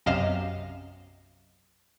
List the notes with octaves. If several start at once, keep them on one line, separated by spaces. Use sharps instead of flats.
B1 F#2 C3 D#5 F5 E7